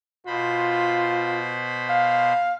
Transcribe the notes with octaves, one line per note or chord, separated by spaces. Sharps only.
B2 F4 C5 B5
F5